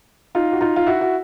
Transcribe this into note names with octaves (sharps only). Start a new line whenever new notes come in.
D#4 F4
F#4
D#4 F4
F4
E4 F#4
F#4